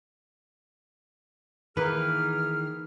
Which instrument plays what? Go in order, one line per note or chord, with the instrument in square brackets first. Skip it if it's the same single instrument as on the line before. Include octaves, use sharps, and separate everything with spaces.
[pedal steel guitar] D#3 E3 [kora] A#3 B4 [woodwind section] G#4 F6